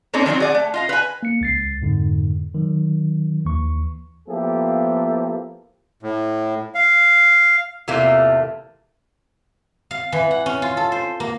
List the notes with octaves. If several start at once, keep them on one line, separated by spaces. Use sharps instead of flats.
A#3 C4 C#4 D#4 A4 D5
D#3 F3 F#3 C4
G#4 D5 F#5
A3
F4 D#5 F5
B4 G#5
A#3 C#7
C#2 A6 C7
F2 G#2 D3
D#3 F#3
D#2 E3 C#6
F3 A#3 B3 E4 G4 A4
A2
F5
E2 A2 C3 A3 A#3 F4
F5
E3
F#5
C#4
F4
A4
C5
A#3